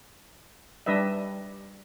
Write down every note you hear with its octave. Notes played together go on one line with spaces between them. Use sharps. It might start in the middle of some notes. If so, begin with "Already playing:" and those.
G3 D4 B4 D#5 E5